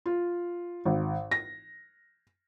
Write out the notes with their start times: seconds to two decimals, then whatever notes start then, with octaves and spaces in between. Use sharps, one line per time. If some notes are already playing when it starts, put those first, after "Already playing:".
0.06 F4
0.85 G#1
1.31 A#6